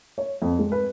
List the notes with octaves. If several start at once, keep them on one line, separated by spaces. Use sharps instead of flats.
C#5
F2
G#3
B4